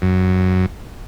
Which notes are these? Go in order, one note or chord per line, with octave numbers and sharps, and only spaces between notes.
F#2